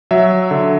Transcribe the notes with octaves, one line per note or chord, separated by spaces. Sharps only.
F#3 E5
D3